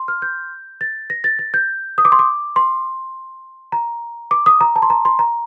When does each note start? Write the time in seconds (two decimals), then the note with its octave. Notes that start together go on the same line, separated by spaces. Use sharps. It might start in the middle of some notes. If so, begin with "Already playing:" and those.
Already playing: C6
0.08 F6
0.22 G6
0.81 A6
1.10 A#6
1.24 A6
1.39 A6
1.54 G6
1.98 D#6
2.05 D6
2.12 C6
2.19 D6
2.56 C6
3.72 A#5
4.31 D6
4.46 D#6
4.61 A#5
4.76 A5
4.82 C6
4.90 A#5
5.05 C6
5.19 A#5